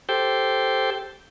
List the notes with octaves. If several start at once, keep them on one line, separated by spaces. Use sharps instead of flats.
G4 A4 C5 G5